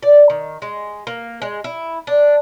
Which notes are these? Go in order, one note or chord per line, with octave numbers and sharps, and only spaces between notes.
D5
D#3
G#3
A#3
G#3
E4
D4